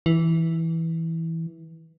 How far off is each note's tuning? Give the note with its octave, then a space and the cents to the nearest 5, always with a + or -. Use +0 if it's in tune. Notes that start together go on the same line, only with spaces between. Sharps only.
E3 -10